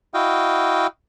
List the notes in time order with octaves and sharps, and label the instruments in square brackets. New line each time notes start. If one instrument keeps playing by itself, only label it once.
[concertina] E4 F#4 D#5 F5 G5